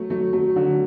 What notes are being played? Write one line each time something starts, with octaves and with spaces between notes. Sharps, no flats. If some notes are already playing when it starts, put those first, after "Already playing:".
Already playing: F#3 A3
F#3 A3
F#3 A3
D3 F#3